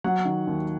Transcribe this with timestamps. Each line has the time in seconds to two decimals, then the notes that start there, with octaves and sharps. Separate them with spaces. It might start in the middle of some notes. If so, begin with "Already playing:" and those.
0.04 F#3 F#5
0.25 D#3
0.47 D#2